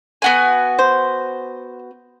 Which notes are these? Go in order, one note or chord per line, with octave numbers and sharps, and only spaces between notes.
B3 F#4 G#5
C5